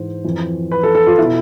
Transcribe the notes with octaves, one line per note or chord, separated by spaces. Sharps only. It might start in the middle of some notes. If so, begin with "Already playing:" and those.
Already playing: G#2 E3 C5
F2 E3
B4
A4
A4
F4
B2 E4